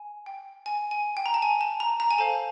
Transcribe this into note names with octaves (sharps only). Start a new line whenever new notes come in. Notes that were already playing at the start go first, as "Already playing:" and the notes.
Already playing: G#5
G5
G#5
G#5
G5
A#5
A5
G#5
A5
A#5
A#5
G#5
A4 C5 F5 A5